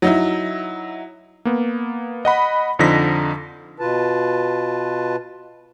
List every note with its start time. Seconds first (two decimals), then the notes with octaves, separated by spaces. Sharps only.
0.02 F#3 D#4 E4
1.45 A#3 B3
2.25 D#5 F#5 B5
2.79 F2 D3 F3 D#4 A#6 B6
3.80 B2 F4 B4 A5